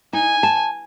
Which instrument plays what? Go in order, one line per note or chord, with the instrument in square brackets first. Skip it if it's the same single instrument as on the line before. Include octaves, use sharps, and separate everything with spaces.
[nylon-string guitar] D#4 [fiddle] G#5
[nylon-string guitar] A5